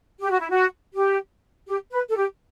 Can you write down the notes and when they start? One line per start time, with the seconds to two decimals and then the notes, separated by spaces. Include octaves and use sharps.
0.20 G4
0.31 F#4
0.40 E4
0.50 F#4
0.94 G4
1.67 G4
1.91 B4
2.09 A4
2.16 G4